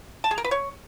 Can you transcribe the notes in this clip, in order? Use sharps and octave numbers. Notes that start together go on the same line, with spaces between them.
A5
G#4
A#4
B4
C#5